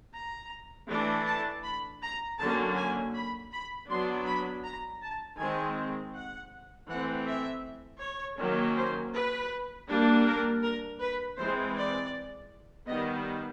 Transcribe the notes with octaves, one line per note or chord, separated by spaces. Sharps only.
A#5
E3 A3 D4
A5
B5
A#5
D3 F#3 A#3 C#4 A5
G#5
B5
B5
F#3 B3 D4 C6
B5
A#5
A5
D#3 G#3 C4 G#5
F#5
E3 A3 C4 F#5
E5
C#5
D#3 F#3 A#3 C#4
C5
B4
G3 A#3 D4
A#4
A#4
B4
E3 G#3 C4 C5
D5
D#3 G3 B3 D#5